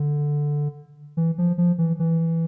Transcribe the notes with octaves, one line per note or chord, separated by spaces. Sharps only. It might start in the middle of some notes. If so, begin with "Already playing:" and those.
Already playing: D3
E3
F3
F3
E3
E3